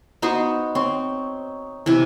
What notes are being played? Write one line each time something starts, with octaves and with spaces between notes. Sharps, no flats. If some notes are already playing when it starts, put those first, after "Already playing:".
B3 D#4 F#4 C5
C4 C#5
C3 E3